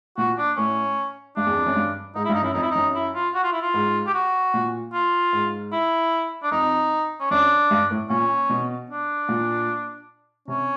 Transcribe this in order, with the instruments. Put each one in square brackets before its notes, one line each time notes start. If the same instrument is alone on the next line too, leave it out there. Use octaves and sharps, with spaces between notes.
[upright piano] A#2 [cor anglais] F#4
[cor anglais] D4
[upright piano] A2 [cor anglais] C#4
[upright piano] G2 [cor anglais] D4
[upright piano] E2
F2
F#2
G2
[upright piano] G#2 [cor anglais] D#4
[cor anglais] E4
[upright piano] G2
[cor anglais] D#4
[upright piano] F#2 [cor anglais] E4
[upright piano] F2 [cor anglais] D#4
[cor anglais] E4
[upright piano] F#2 [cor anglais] D#4
[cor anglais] E4
F4
F#4
F4
E4
F4
[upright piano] G#2
[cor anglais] G4
F#4
[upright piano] A#2
[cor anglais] F4
[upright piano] G#2
[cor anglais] E4
D4
[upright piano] F2 [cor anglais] D#4
[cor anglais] C#4
[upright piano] F#2 [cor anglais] D4
[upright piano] G2
A2
[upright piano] A#2 [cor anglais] C#4
[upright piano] B2
[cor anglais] D4
[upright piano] A#2
[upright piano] C3 [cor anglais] C#4